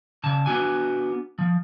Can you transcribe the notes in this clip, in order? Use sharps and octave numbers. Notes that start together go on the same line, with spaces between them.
C#3 A5
B3 D4 F#4 G#5
F3